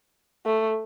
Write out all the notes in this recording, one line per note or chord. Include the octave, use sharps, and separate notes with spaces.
A3